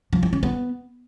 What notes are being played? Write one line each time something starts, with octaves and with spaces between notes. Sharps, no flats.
F3
E4
C#4
B3